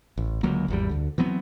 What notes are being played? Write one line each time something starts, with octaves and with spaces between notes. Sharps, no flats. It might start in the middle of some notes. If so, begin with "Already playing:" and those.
A1
C#2 D3 F#3 A#3
G#1 E2 G3
D2 D3
E3 F#3 B3 C4